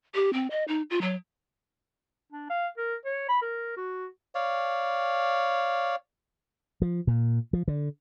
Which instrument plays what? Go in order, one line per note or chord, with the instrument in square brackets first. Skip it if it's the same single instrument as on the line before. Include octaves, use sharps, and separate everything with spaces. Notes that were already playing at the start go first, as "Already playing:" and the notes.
[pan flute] G4
C4
D#5
D#4
F4
F#3
[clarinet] D4
F5
A#4
C#5
B5
A#4
F#4
[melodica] C#5 D5 F5
[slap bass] F3
A#2
F3
D3